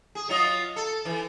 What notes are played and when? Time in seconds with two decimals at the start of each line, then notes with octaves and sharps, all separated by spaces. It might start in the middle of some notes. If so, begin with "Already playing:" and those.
0.15 G#4
0.29 F#3 F4 D#5
0.76 A4
1.05 E3